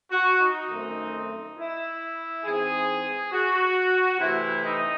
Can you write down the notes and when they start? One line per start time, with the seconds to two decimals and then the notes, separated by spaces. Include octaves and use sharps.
0.12 F#4
0.41 D#4
0.70 F#2 D#3 A3 C4
1.57 E4
2.45 G#2 E3 C4 G#4
3.33 F#4
4.20 C3 E3 A3 E4
4.63 D#4